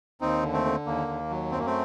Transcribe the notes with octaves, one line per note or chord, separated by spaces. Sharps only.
D#2 C4 D#4
D3
A3 C4
D3
D#2 A#3
D#2
F#3
F#2 C4
A#3
A3 C4